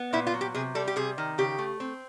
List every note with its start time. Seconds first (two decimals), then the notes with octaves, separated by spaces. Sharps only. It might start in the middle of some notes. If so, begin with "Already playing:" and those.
Already playing: B3
0.13 A#2 E4
0.27 F4
0.34 F#3
0.41 G4
0.54 C3 G#4
0.75 G3 A4
0.88 G4
0.96 C3 G#4
1.18 D#3
1.38 C#3 G4
1.58 A3
1.80 C4